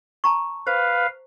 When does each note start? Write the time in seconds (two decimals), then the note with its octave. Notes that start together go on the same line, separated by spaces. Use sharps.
0.24 A5 A#5 C#6
0.67 B4 C5 F5